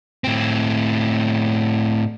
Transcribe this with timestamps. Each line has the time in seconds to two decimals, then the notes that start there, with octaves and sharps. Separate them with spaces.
0.24 A2 C4